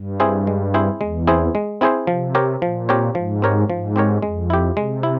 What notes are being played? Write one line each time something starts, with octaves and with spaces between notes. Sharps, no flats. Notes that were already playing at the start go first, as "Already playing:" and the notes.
Already playing: G2
C4 E4 G#4 C5
G#3
C4 E4 G#4 C5
E2 G#3
C4 E4 G#4 C5
G#3
C4 E4 G#4 C5
C3 F3
C4 G4 A#4 C#5
A#2 F3
C4 G4 A#4 C#5
G#2 F3
C4 G4 A#4 C#5
G#2 F3
C4 G4 A#4 C#5
F2 G#3
E4 G4
C3 G#3
E4